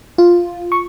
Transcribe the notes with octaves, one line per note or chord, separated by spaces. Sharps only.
F4
C#6